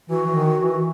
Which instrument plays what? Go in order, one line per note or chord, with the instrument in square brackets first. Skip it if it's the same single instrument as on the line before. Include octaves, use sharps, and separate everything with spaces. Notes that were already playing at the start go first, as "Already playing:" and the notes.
[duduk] E3 [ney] F#4
[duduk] E3
D#3
E3